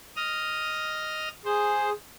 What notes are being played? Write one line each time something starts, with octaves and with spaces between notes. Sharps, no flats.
D#5 D#6 F6
G#4 C5